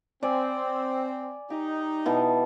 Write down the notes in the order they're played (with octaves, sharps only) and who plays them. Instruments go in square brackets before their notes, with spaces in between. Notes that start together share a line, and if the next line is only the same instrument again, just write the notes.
[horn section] C4 [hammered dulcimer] D5 G#5 B5
[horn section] D#4 [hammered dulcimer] G4
[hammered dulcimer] B2 E3 A5